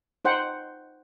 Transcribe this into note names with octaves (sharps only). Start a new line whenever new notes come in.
D#4 C5 F#5 G5